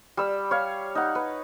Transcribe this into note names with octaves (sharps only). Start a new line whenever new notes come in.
G3 E6
C#5 F5
D#4 F#5
B4